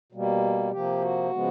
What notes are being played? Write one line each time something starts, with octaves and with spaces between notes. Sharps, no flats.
B2 G3 A#3
C3 F3 A#3 G4
F#4
C#3 F3 G#3 B3